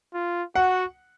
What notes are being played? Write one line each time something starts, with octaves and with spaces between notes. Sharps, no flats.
F4
F#4 F#5